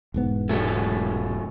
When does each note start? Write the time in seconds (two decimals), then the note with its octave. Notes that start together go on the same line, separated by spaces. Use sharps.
0.14 E1 G#2 B3
0.49 C3 F#3 A3